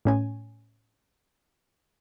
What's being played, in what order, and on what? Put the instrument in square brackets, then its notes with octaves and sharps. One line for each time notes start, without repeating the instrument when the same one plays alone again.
[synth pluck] A2 C#4 G#5